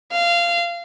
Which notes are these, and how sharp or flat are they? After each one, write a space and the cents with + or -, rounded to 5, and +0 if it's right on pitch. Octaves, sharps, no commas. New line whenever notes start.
F5 -20